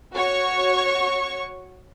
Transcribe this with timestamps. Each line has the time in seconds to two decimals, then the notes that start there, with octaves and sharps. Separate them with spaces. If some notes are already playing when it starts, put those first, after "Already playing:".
0.14 F#4 C#5 C#6